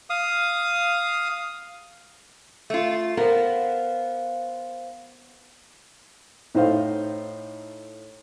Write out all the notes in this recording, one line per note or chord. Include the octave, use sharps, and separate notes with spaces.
F5 D#6
A3 F4
B3 A#4 C5 F5
A2 D#4 C5 F5